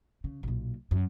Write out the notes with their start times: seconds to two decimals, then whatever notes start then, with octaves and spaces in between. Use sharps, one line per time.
0.24 C#3
0.43 B1 A#2
0.91 F#2